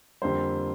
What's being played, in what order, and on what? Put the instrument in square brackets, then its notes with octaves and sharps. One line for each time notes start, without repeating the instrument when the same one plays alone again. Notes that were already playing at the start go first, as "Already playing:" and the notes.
[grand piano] F2 D3 G3 A#3 C5